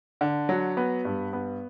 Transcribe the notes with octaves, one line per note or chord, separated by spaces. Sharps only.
D3
F#3
B3
G2
B3